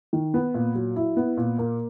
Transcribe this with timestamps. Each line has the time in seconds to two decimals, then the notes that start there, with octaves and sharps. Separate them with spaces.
0.13 D#3
0.34 B3
0.54 A#2
0.75 F#3
0.96 E4
1.17 B3
1.37 A#2
1.58 A#3